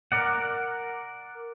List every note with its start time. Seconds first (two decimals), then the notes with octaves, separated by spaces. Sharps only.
0.12 A#4 D5 F#5